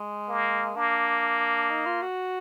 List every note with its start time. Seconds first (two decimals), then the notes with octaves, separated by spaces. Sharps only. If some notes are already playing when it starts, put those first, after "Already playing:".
Already playing: G#3
0.28 A#3
0.76 A#3 D4
1.70 D#4
1.86 F4
2.02 F#4